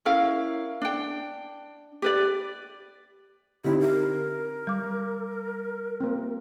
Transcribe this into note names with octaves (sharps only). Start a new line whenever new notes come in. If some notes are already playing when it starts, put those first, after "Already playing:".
C#4 E4 A#4 F5
D4 G5
G4 B4 D5
D3 C4 D#4 E4 G4
A#4
G3 D6
A#3 C4